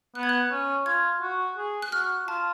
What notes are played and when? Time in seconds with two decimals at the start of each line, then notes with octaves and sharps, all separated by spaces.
0.15 B3 F#6
0.23 G#6
0.29 F#6
0.52 C#4
0.86 F4 G#6
1.22 F#4
1.57 G#4
1.82 F#6
1.92 F#4 F6
2.27 F4 A5